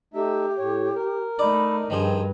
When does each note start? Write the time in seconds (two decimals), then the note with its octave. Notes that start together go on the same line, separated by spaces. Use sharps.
0.14 A3 D#4 G4 E5
0.58 A2 C#5
0.96 A#4
1.39 A3 D#4 D5 B5
1.90 G2 D#3 F3 D#4 G#4